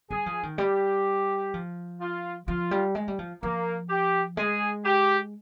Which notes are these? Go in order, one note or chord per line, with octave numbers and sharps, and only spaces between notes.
G3 G#4
F3
D#3
G3 G4
F3
F4
F3 F4
G3
G#3
G3
F3
F3 A#3
G4
G#3 G#4
G4